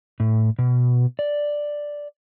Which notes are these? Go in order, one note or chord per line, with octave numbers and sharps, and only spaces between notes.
A2
B2
D5